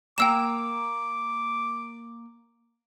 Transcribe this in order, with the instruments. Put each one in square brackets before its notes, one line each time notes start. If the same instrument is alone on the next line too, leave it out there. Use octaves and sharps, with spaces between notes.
[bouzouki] A#3 A#5 [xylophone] G5 E6 E7 [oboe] D6